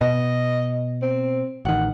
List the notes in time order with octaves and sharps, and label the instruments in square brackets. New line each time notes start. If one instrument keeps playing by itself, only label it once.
[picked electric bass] B2 [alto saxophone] D#5
[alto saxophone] C4
[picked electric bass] A1 D#3 [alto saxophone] F#5